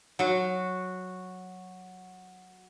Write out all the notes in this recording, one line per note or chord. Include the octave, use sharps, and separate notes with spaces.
F#3 F#4